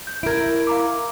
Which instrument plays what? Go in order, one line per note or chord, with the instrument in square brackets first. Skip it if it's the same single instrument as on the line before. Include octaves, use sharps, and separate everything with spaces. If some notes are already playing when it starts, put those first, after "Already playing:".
[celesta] G6
[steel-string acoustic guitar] E4 A#4 [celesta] G#6 D7
[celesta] F5 A#5 D6